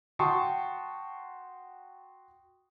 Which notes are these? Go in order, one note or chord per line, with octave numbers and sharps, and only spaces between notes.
F#4 G5 A5 C6 C#6 D#6